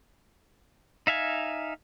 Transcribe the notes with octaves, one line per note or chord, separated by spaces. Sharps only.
D#4 E5 F5 G#5